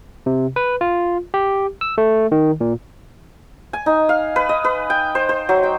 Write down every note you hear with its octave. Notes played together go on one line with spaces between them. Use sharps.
C3
B4
F4
G4
E6
A3
D#3
A#2
G#5
D#4
F5
B4
D#5
B4
G5
C5
C5
F#3
G5